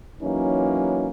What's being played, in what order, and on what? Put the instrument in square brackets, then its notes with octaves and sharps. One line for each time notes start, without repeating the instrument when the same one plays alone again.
[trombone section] E3 F#3 A#3 C#4 D#4